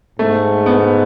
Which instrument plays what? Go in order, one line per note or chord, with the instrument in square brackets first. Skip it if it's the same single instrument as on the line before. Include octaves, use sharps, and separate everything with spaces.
[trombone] G#2 [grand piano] A3
[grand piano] B3